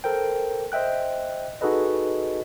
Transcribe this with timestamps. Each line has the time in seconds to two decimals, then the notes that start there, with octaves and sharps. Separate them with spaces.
0.04 A4 A#4 C5 G5
0.72 C5 D#5 E5 G5 F#6
1.61 D#4 F#4 G#4 A4 B4 D#5